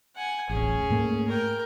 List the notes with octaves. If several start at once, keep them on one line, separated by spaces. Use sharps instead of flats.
F#5 G#5
D1 A1 C#4 G#4
G#2 A3 A#3
A#4 G5